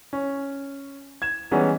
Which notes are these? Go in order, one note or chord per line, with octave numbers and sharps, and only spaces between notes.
C#4
G#6 E7
E3 G3 G#3 B3 C#4 D#4